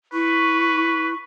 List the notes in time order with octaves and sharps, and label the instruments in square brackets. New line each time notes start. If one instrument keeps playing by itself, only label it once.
[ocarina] E4 [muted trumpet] B4 [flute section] C#6